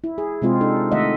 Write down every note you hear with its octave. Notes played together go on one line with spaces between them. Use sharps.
E4
G#4
C3 G#3 C4 F4
D4 D#4 A4
D#3 A3 D#5 E5 F#5